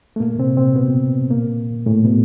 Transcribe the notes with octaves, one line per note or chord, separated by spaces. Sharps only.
A3
A#2 A#3
C3 C4
C3 C4
B2 B3
A#2 A#3
A2 A3
B2 B3